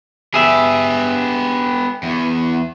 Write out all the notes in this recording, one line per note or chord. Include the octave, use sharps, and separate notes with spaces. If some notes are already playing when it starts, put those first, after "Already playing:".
B3 G4 G#4 E5
E2